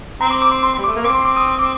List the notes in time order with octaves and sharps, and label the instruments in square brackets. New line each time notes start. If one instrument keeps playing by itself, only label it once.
[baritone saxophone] C4 [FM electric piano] A#5
[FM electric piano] D6
D6
C6
C6
[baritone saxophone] G3
[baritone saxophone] A3 [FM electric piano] D6
[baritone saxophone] A#3
[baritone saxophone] C4 [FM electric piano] D6
[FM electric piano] C6
D6
D#6
D#6
D6